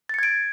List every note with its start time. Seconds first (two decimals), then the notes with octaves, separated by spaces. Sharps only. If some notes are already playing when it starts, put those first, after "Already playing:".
0.09 A6
0.14 C#7
0.19 G#6
0.23 D7